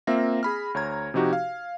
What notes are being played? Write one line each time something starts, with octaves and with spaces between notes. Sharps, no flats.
A#3 C4 F4 E5 A#6
G#4 B5 F6
D2 C#5 A#5 G#6
C3 F3 D#4 F#4 G4
F5